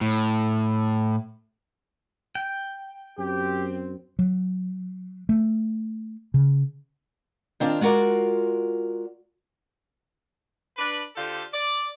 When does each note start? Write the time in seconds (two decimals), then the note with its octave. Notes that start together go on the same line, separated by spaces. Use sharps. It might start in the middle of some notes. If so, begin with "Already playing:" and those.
0.01 A2
2.35 G5
3.19 F#2 C4 G4
4.19 F#3
5.29 A3
6.34 C#3
7.60 D#3 C4 D4 F4
7.81 G#3 F4 F#4 A#4 D5
10.77 D4 B4
11.16 D3 F4 G4 A4 C5
11.53 D5